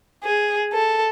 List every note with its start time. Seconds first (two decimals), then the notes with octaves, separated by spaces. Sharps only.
0.24 G#4
0.73 A4